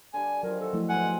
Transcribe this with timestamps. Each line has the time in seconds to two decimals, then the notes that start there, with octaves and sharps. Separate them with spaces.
0.14 D3 G3 G#5
0.43 D#3 F3 F#3 F4 A#4
0.60 D#3 F#4 A4
0.73 F3 A3 E4
0.89 G#2 B2 F#5 G#5 C6